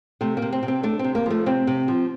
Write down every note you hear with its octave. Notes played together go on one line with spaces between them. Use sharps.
C3 A3
A#3
C3
C4
C3
C4
A3 D4
C3 C4
A#3
F3 A3
C3 C4
C3
F3